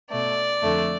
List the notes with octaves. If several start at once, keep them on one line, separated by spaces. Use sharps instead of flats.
B2 A3 D5
F2 D3 A3